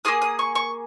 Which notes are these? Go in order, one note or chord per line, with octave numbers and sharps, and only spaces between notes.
A#3 F4 G#4 D#6
D#6
C#6
C#6